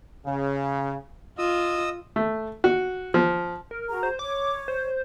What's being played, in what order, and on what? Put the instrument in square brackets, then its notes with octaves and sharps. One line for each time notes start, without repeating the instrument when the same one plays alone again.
[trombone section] C#3
[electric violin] F4 [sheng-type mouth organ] D#5 D#6 E6
[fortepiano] A3
F#4
F3
[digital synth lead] A#4
[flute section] F#4 G#4 A#5
[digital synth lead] C5
[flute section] C#5 [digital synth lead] D6
[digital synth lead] C5